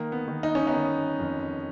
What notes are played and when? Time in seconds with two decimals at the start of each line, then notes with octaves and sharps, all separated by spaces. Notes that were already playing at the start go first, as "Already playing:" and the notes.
Already playing: D#3 A#3
0.12 B3
0.28 D#3
0.43 D#4
0.55 C#4
0.67 B3 D#4
0.73 D#3
1.19 F2